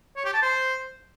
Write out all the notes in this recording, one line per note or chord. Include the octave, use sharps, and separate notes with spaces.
C#5
G4
A5
C5